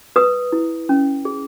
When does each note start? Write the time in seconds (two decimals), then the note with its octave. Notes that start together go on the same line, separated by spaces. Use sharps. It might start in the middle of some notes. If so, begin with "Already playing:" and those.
0.16 B4 D#6
0.52 E4
0.89 C#4
1.25 G#4